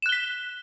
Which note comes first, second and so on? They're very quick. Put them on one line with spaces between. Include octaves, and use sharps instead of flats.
E7 F#6 G7 B6